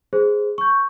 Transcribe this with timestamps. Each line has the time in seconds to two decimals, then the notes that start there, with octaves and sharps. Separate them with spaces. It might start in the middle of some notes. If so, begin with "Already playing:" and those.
0.13 G#4 C5
0.58 C#6 G6